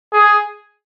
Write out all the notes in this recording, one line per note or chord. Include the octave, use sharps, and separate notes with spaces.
G#4